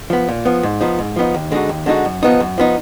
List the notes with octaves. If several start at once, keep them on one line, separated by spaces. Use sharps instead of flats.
F3 B3
A#2
F3 B3
G#2
F3 B3 D#4
G#2
F3 B3 D#4
D#2
D3 G#3 D#4 F#4
D#2
D3 G#3 D#4 F#4
F#2
F3 B3 D#4
F#2
F3 B3 D#4